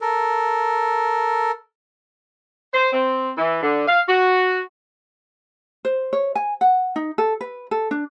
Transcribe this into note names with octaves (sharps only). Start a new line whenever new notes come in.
A4 A#4
C5
C4
E3
D3
F5
F#4
C5
C#5
G#5
F#5
D#4
A4
B4
A4
D4